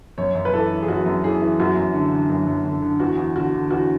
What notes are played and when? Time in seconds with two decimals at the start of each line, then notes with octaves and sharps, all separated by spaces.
0.18 F#2 C#5
0.35 F#2
0.45 B4
0.53 E3 A4
0.71 E3
0.83 G#4
0.88 F#2 F#4
1.06 F#2
1.24 E3 G#4
1.41 E3
1.60 F#2 F#4
1.77 F#2
1.94 D3
2.12 D3
2.30 F#2
2.47 F#2
2.65 D3
2.82 D3
3.00 E2 F#4
3.17 E2
3.36 D3 F#4
3.54 D3
3.71 E2 F#4